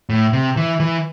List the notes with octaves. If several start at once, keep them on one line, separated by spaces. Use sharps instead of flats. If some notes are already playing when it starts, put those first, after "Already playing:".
A2
C3
E3
E3